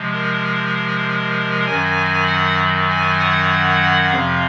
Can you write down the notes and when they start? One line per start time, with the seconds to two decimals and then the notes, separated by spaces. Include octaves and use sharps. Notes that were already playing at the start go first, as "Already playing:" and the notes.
Already playing: C3 F3 G#3
0.12 A#4
1.66 F#2 D#3 F#3 G#5
2.27 F#5
2.89 G#5
3.19 F#5
4.11 F2 C3 F3 F5